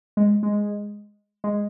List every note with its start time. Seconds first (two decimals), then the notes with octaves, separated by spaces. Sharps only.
0.17 G#3
0.43 G#3
1.44 G#3